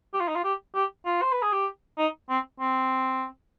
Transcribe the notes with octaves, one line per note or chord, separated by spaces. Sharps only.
G4
F4
D#4
F4
G4
G4
F4
C5
B4
G#4
G4
D#4
C4
C4